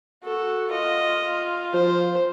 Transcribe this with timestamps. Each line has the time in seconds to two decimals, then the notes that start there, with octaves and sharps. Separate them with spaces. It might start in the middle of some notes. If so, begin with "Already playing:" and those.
0.25 F#4 A4
0.72 F4 D#5
1.74 F3 C5